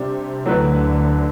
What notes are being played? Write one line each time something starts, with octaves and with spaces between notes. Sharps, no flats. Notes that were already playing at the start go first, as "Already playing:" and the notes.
Already playing: C3 G3 D4 G4
D2 D3 F#3 A3 E4 B4